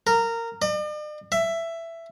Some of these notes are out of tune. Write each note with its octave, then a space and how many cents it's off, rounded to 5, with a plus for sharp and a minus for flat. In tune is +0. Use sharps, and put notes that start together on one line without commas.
A#4 -15
D5 +45
E5 +15